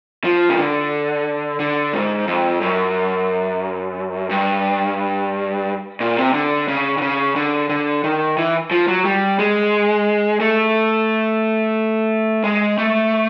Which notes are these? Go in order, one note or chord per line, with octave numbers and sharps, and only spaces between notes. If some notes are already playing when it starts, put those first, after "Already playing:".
F3
C#3
D3
D3
G#2
F2
F#2
G2
A#2
C3
D3
C#3
D3
C#3
D3
D3
D#3
E3
F3
F#3
G3
G#3
A3
G#3
A3